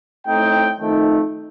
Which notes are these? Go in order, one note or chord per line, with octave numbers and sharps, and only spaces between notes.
A2 A3 C4 D#4 G5
F2 D#3 A3 D#4